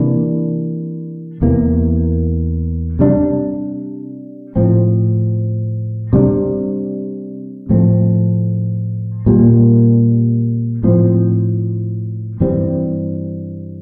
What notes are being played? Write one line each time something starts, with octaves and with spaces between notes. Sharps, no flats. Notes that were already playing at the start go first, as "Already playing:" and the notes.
Already playing: C3 E3 A#3 D4
E2 C3 E3 A#3
C3 G3 D4
A2 F3 C4
C3 G3 D4
A2 F3 A3 C4
A#2 G3 A#3
A2 F3 C4
G2 E3 G3 C4